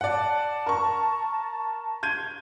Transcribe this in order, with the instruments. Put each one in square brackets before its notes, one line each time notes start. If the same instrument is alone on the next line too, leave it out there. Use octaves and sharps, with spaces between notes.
[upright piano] D5 F#5 [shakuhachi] A5
[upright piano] A#4 C#6
G6 G#6 D#7